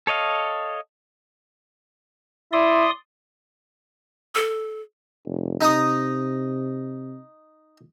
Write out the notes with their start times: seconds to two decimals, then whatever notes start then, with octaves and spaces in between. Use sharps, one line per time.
0.07 A4 C#5 D#5 F5
2.53 E4 D5 C6 D#6
4.35 A4
5.25 F1
5.61 C3 D#4 A#5 D#6